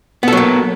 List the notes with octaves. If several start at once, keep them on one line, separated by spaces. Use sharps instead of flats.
F#3 A#3 B3 A4